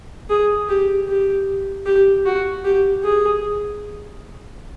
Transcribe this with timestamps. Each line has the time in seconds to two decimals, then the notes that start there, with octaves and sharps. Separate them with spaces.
0.30 G#4
0.69 G4
1.08 G4
1.86 G4
2.26 F#4
2.64 G4
3.04 G#4